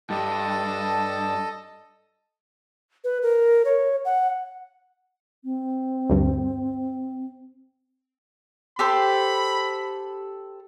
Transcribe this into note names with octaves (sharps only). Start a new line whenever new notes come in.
G2 A4 D#5 A5
B4
A#4
C#5
F#5
C4
D2 G2
G4 A4 C5 B5